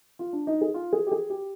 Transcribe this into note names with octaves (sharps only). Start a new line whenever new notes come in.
F4
D4
D#4
G#4
F4
G#4
G4
G#4
G4